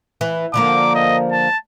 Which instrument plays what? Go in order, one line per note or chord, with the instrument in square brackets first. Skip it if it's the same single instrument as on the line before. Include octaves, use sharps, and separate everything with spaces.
[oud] E3
[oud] D3 F3 A#3 [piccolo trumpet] D6
[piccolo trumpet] D#5
A5